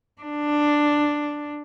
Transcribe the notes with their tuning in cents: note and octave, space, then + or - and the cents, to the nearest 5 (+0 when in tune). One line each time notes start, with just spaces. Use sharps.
D4 +5